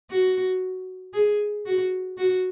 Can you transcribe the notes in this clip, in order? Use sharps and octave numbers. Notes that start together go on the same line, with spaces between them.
F#4
G#4
F#4
F#4